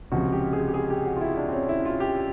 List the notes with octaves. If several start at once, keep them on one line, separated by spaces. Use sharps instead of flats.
C#2 C3 F3 F#4
G4
G#4
G4
G#4
G4
F#4
F4
E4
D4
C4
C#4
E4
F4
G4